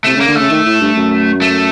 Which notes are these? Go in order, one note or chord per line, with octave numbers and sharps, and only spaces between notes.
C3 A3
C#3
A#3
D3
C#3 A3
D#3
A2
G2
F#2
A3